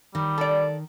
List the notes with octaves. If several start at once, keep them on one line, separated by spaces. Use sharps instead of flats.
D#3 G3
A4 D5